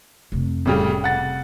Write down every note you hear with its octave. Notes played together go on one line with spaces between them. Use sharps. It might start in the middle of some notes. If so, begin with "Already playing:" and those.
F1 C3
A2 C#3 G3
F#5 A6